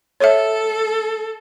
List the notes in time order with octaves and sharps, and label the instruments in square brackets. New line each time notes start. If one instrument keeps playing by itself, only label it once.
[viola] A4 [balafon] C#5 E5